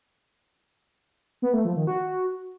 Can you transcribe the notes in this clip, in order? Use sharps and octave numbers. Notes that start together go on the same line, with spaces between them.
B3
A3
F3
D#3
F#4